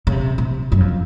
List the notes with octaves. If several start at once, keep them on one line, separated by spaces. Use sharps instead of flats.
C#3
C3
C3
F#2
F2